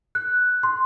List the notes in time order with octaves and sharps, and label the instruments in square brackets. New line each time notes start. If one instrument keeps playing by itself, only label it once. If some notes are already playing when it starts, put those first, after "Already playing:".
[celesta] F#6
C6